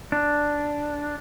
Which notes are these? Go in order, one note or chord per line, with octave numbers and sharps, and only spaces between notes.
D4